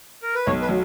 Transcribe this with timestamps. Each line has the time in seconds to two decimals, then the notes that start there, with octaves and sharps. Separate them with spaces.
0.23 A#4
0.34 B4
0.46 B1 C#5
0.62 B4
0.69 F#3